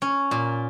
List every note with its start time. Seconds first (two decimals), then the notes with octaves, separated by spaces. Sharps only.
0.02 C#4
0.31 A#2